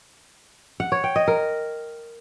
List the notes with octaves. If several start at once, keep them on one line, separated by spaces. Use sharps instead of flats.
F#5
C#5
G5
D#5
A#4